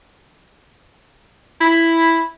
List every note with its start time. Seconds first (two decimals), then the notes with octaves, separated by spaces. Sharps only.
1.60 E4